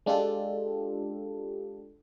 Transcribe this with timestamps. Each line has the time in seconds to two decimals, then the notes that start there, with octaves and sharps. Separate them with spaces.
0.06 G#3 D4 F4 G4 A4